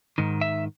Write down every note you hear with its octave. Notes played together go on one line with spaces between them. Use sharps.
G#2 D#3
E5